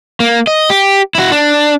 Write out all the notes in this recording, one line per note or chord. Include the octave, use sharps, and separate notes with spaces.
A#3
D#5
G4
E4 F#4
D4